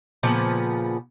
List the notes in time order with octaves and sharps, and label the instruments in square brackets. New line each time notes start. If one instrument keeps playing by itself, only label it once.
[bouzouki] A#2 C#3 F3 B3